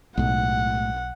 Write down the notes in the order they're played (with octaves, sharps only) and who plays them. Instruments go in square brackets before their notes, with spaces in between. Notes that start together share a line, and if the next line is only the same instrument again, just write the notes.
[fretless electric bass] B1 [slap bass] A2 G#3 [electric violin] F#5